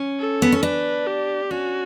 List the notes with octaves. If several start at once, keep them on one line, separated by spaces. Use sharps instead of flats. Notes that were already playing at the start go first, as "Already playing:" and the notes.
Already playing: C#4
A4
B3
C#4
D4 B4
G4
C#4 F#4